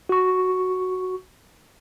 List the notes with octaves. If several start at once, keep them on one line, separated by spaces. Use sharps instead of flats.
F#4 C#6